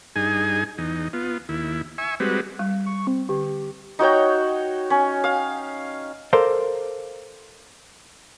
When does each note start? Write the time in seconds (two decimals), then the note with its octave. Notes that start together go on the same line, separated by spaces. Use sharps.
0.16 G2 D#4 G#4 G#5
0.78 E2 D#4
1.13 B3 F4
1.49 D#2 E4
1.98 E5 G#5 C#6
2.20 G3 G#3 C4 F#4 B4
2.59 G3
2.86 C#6
3.07 C4
3.29 D3 G4
3.99 D#4 F#4 C#5 G5
4.90 C#4
5.24 F5
6.33 A4 A#4 C5 D5 F5